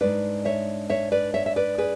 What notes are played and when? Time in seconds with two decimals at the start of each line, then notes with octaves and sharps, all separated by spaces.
0.01 G#2 G#3 D4 B4 D5
0.45 C#5 E5
0.90 C#5 E5
1.12 B4 D5
1.34 C#5 E5
1.46 E5
1.56 B4 D5
1.78 G#4 B4